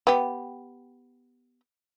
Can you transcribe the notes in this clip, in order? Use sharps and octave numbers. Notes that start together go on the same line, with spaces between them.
B3 G4